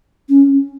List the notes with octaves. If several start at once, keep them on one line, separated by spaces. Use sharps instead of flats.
C#4